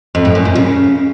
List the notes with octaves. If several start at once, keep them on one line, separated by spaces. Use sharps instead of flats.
F2
A2
F#2
A#2
C#3